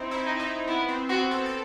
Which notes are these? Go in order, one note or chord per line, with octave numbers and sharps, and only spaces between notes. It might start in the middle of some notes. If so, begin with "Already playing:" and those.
Already playing: C4 D#4 E4
E4
D#4
D#4
B3 E4
C4
C4 F#4
A4
A4